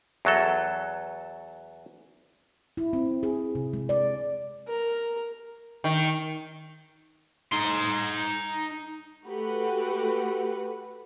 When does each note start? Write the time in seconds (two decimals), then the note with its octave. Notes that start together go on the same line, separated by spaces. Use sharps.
0.25 E2 F#3 A4
2.77 E4
2.93 C4
3.23 G#4
3.55 C3
3.74 G#3
3.89 D5
4.68 A#4
5.84 D#3
7.52 D#4 C6
9.26 A3 F#4 G4 A4 B4 F#5